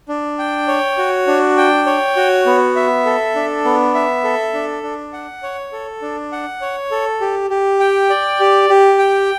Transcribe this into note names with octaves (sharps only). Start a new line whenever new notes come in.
D4
G5
C#5
F#4
D4
G5
C#5
F#4
B3
E5
A4
D4
B3
E5
A4
D4
D4
F#5
C#5
A4
D4
F#5
C#5
A4
G4
G4
G5
D5
G4
G4
G5